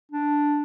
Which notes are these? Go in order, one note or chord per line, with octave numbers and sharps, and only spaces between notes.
D4